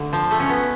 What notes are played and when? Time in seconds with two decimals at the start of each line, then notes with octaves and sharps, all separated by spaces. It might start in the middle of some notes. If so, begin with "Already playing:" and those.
Already playing: D3 A3
0.13 F3
0.31 A3
0.40 C#4
0.49 B3